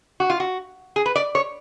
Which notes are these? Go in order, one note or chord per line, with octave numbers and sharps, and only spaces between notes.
F#4
F4
F#4
G#4
B4
D5
C#5